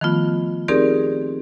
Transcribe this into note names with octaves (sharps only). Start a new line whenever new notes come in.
D#3 F3 A3 B3 F4
C4 D#4 G4 G#4 A#4 D5